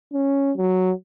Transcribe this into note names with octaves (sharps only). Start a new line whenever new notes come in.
C#4
F#3